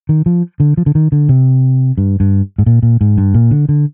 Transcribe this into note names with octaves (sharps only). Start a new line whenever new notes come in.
D#3
F3
D3
F3
D3
D#3
D3
C3
G2
G2
G#2
A#2
A#2
G#2
G2
A#2
D3
D3